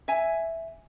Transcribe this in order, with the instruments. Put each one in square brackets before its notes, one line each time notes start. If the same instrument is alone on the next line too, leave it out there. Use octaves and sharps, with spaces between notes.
[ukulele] E5 G#5